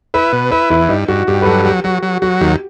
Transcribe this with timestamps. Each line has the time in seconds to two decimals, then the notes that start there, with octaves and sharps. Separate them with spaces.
0.14 E4 B4
0.33 B2
0.51 E4 B4
0.70 E2 E4
0.89 G2 D#4
1.08 G2 F#4
1.27 G2 G4
1.42 B4
1.46 F#3 A4
1.65 F#3 G4
1.84 F#3 F#4
2.03 F#3
2.22 F#3 F#4
2.41 D#2 G4